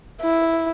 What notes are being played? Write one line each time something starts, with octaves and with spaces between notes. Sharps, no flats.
E4